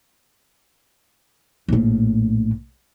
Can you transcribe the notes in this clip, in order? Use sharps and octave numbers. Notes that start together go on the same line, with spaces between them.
A#1 A2